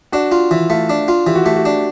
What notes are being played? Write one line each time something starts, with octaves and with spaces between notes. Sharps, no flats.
D4 F#4
F4
E3
A3 F4
D4
F4
E3 G4
F#4
A3 G4
F#4
D4